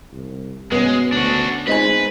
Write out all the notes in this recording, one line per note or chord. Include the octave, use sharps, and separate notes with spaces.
C2
B2 G#3 B3 C#4
D2 D4 F#4
G#3 C4 D#4 B4 G#5